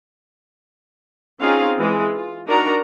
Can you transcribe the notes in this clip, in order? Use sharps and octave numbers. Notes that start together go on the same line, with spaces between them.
C4 C#4 D#4 F4 G#4 F5
E3 G#3
F4
D4 D#4 F#4 A#4 A#5